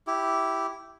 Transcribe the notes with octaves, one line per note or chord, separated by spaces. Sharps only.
E4 G4